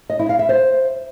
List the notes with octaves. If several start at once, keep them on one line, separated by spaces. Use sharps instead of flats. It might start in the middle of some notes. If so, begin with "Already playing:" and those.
D#5
E4
F5
E5
C5